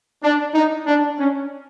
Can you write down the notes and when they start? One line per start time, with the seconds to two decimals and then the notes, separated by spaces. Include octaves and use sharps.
0.24 D4
0.55 D#4
0.87 D4
1.18 C#4